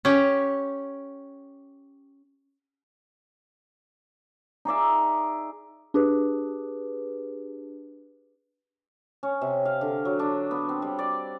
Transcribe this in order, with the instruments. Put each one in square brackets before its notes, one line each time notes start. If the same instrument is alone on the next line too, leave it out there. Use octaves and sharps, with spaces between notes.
[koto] C#4 G4
[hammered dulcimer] D#4 G#4 D5 E5
[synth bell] D4 G4 G#4 B4
[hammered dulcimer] C#4
C3
F5
D3
F#3
D4
B3
C4
G3
D5